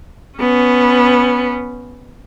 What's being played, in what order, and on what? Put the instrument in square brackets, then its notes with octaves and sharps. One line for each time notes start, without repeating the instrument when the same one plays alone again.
[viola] B3 C#4